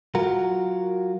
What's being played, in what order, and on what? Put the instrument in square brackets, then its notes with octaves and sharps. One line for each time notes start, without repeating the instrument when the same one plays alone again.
[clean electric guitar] F#3 F4 F#4 A#4